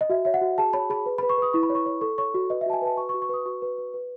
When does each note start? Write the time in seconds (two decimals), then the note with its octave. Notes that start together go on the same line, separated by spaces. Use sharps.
0.01 D#5
0.10 F#4 E5
0.25 C#5 E5
0.34 F#5
0.41 F#4
0.58 G#4 A5
0.73 C#5 B5
0.90 G#4 B5
1.06 B4
1.18 B5
1.23 B4
1.29 C#6
1.38 B4 D#6
1.53 E4 C#6
1.63 B5
1.70 C#5
1.75 C#6
1.86 C#5
2.01 A4 C#6
2.18 C#5 C#6
2.34 F#4
2.50 B4 D#5
2.61 E5
2.66 F#4 A5
2.73 G#5
2.82 B4 A5
2.97 F#4 C#6
3.09 C#6
3.14 F#4
3.22 C#6
3.29 B4 D#6
3.46 F#4 C#6
3.62 B4
3.78 B4
3.94 B4